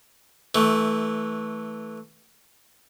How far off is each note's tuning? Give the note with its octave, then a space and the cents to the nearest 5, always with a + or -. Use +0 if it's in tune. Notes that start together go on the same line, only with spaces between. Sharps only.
E3 -15 A3 +0